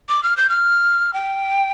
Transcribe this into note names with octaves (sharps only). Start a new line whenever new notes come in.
D6
F6
G6
F6
G5